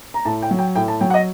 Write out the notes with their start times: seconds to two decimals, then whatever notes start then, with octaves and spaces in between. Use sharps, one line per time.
0.14 A#5
0.25 A2 A5
0.42 G5
0.51 F#3
0.59 G5
0.75 A2 G5
0.88 A5
1.01 F#3 G5
1.10 F#5
1.14 D#5